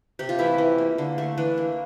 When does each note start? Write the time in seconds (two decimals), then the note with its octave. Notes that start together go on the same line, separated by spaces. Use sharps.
0.19 C3 G4
0.29 F4
0.38 E3 A3 E4
0.58 E3
0.78 A#3
0.98 D3
1.18 A3
1.38 E3 D4
1.58 A#3